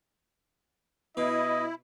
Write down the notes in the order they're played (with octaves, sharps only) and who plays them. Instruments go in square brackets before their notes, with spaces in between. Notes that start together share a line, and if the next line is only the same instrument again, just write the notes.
[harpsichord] B2 [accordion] E4 [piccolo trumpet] D#5